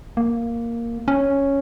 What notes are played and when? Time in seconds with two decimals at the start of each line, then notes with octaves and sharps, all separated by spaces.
0.17 A#3
1.08 C#4